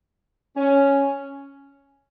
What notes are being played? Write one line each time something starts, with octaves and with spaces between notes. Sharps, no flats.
C#4